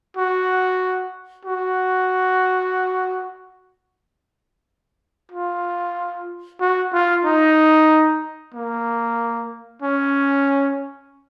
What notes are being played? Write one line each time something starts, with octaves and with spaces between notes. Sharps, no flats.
F#4
F#4
F4
F#4
F4
D#4
A#3
C#4